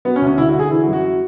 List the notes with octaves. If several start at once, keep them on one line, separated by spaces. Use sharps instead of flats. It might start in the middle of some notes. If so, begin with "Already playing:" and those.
F#3 B3
C#4
D2
C#4
D3 E4
F#4
D3 G#4
E3 E4
F#4
F#2
F#4